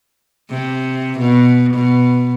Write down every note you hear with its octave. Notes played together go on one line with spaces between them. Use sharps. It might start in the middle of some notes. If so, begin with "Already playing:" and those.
C3
B2
B2